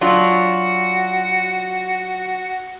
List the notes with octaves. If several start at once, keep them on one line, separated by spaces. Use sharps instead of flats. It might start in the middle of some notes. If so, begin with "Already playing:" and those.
F#3 D4 F4 F#4